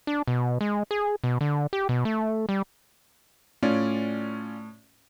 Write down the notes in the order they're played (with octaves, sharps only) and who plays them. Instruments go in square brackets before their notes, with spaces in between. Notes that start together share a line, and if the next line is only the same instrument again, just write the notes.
[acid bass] D4
B2
G#3
G#4
B2
D3
G4
B2
A3
G3
[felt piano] A2 [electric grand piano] C#4 F4 D5